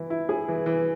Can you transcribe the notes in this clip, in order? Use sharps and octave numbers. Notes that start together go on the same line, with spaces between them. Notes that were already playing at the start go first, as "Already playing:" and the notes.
Already playing: E3 E4
E4
G#4
E3
E3